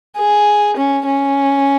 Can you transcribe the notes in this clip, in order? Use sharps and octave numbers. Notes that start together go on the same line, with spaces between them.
G#4
C#4
C#4